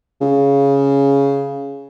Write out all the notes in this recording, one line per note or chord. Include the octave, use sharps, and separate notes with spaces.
C#3